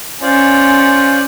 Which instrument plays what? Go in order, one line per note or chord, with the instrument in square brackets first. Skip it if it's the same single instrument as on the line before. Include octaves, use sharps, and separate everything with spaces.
[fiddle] C#4 [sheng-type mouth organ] F4 C5 D5